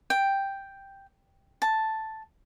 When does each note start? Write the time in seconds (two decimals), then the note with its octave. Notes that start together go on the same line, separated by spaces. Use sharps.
0.10 G5
1.62 A5